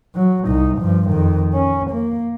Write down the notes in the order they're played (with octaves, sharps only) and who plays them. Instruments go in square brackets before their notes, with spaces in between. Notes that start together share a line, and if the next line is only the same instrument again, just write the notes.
[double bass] F#3
C2 D#4
G2 F3
F2 D#3
C#4
A#3